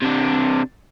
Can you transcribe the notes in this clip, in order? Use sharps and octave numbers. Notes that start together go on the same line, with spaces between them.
C3 D4